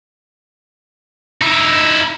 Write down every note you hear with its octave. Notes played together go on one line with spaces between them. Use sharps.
D#4 E4